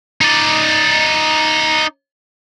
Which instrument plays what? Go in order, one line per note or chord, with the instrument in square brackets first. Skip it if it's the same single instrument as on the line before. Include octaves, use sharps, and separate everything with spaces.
[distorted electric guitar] D#4 D5